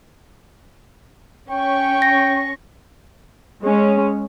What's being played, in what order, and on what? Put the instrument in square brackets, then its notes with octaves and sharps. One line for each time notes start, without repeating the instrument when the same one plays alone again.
[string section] C#4 C#6 [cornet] G5
[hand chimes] A#6
[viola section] G#3 C#4